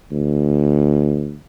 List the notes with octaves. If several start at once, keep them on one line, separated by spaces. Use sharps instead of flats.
D2